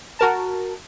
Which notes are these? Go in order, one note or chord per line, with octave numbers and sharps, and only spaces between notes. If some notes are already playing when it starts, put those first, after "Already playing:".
F#4 A#4 A5